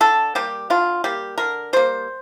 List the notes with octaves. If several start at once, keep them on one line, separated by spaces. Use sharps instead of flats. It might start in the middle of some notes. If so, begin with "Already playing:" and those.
D3 A4
G3 A#3 G4
D3 F4
G3 A#3 G4
D3 A#4
G3 A#3 C5